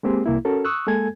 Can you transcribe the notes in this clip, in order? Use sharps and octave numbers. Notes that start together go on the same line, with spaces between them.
G#3 A#3 C4 G4 G#4
C2 A#3 E4
C#4 F#4 A4 A#4
C#6 D#6 E6 F#6
G#3 A#3 A4 G#5 G#6